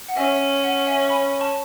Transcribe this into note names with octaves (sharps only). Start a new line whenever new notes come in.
F#5
C#4 E5 G#5
F#5
E5 G#5
C#6
G#5 B5
A5 C#6